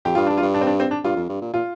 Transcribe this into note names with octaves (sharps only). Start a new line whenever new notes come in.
F2 G4
G2 F4
G2 D4
F4
G2
D4
C4
D4
C4
D4
G2 F4
F2
G2
A#2
A#2 F4